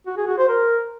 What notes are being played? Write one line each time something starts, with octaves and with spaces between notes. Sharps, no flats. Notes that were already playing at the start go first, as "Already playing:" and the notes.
F#4
G#4
F#4
C5
A#4